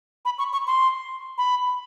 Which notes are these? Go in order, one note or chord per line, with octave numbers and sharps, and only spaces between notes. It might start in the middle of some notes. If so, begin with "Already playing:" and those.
B5
C#6
C#6
C6
B5